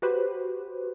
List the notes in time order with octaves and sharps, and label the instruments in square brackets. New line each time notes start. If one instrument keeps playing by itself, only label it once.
[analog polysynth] F#4 G4 B4 C5